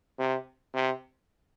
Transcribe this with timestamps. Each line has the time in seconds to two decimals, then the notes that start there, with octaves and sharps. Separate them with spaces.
0.19 C3
0.74 C3